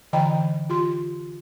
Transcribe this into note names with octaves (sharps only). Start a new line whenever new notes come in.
D3 E3 D#5 G5 A#5 B5
F4 G4 C6